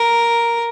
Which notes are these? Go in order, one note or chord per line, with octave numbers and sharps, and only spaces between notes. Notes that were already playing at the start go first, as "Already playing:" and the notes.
Already playing: A#4